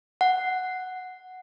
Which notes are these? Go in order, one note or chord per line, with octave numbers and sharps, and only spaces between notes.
F#5